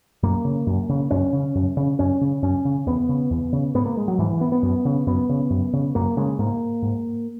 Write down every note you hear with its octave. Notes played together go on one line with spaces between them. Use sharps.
F#2 A#3
C#3
F#2
C#3
F#2 C#4
C#3
F#2
C#3
F#2 C#4
C#3
F#2 C#4
C#3
E2 B3
C#3
E2
C#3
G#2 B3
A#3
G#3
F#3
G#2 E3
E3
B3
B3
F#2
C#3
F#2 B3
C#3
F#2
C#3
F#2 A#3
C#3 G#3
G#2 A#3
G#2